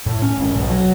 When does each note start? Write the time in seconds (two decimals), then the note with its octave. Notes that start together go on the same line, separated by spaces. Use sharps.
0.06 A2
0.22 C#4
0.38 G#1
0.54 B1
0.69 F#3